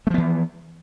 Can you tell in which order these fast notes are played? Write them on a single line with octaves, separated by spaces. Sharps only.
A3 F3 B3 E3